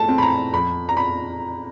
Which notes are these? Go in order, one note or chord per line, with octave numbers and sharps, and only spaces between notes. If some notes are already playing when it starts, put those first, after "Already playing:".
Already playing: A3 A5
C4
B5
A#5
F2 B5
A#5
B5